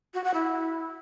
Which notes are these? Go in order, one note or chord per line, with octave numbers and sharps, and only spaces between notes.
F#4
F#5
E4